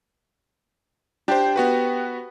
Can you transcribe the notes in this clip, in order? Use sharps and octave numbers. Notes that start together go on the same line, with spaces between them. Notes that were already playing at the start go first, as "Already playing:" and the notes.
D4 G4 C5
B3 F#4 B4